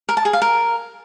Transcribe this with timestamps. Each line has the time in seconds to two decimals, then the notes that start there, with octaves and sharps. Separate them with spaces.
0.09 A#4
0.17 A5
0.25 G#4
0.33 F5
0.42 A#4